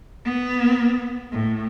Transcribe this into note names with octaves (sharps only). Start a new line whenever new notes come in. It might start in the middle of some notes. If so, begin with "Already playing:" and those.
B3
A2